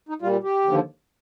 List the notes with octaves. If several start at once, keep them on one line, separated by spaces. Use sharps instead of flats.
D#4
A#2 G3 F4
G4
D#2 D3 F3